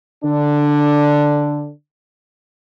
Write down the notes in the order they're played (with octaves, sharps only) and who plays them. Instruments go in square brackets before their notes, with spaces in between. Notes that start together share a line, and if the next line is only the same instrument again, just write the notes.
[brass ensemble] D3 D4